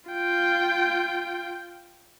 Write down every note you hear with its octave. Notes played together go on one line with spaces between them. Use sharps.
F4 G5